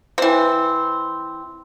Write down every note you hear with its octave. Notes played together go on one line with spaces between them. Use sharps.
E3 C4